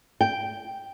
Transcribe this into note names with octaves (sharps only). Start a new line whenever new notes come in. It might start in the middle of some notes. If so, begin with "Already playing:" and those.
G5